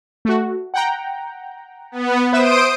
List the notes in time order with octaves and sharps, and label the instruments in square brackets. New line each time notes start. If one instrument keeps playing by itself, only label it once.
[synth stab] A3 F#4
F#5 G5 A#5
[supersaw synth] B3
[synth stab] B4 E5 E7 [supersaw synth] C5 D#6 D7